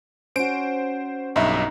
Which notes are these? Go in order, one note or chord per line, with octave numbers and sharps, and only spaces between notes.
C#4 F#4 C5 D7
B1 G2 D#4 E5